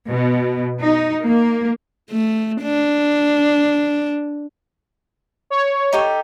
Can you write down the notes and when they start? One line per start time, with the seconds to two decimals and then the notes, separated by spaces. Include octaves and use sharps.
0.10 B2
0.83 D#4
1.26 A#3
2.11 A3
2.62 D4
5.50 C#5
5.93 D#4 G4 A4